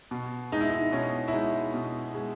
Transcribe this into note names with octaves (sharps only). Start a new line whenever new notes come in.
B2
G#3 D#4
E4
D#4
B2 C#4
E4
G#3 D#4
B2
G#3